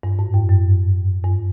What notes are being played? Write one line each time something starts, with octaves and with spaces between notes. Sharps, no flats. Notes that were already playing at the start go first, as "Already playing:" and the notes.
G2
G#2
F#2
F#2
G2